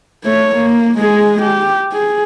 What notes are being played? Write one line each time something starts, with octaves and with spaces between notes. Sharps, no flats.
A3 C#5
A#3
G#3 G#4
G4
G#4